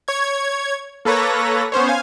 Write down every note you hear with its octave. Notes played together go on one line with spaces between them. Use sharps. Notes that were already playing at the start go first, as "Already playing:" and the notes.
C#5 G#6
A#3 A4 B4 C#5 A#6
B3 C#4 C5 C#5
F5 G#5